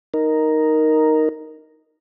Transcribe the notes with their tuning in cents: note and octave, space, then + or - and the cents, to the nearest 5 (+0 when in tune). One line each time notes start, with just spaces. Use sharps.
D#4 +0 A#4 +0